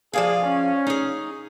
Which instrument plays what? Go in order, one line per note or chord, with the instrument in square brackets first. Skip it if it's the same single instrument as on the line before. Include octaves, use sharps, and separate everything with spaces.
[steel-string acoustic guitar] F3 D5 F5 [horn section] G#4
[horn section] C#4
[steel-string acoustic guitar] D#4 G#4